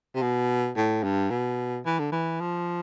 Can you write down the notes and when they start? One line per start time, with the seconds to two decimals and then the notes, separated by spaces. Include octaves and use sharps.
0.15 C3
0.22 B2
0.76 A2
1.03 G2
1.30 B2
1.86 E3
1.99 D3
2.12 E3
2.41 F3